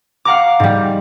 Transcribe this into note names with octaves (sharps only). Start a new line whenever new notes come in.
F5 F#5 A#5 D6
G#2 G3